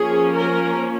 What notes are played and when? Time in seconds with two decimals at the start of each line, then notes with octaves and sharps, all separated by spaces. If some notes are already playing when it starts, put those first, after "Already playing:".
Already playing: F3 A#3 C#4 G#4
0.37 A#4